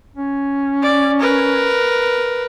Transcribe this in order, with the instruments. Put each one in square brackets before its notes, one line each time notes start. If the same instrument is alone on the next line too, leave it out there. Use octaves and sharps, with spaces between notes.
[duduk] C#4
[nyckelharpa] D5
A#4 B4